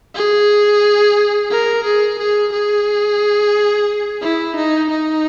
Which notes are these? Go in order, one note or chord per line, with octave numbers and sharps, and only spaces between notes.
G#4
A#4
G#4
G#4
G#4
E4
D#4
D#4